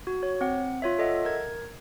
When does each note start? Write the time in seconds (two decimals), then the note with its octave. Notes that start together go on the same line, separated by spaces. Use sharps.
0.07 F#4
0.23 C#5
0.41 C4 F#5
0.82 F4 C#5 E5
0.98 A4 D#5 E5 F#5
1.25 A#4 G#6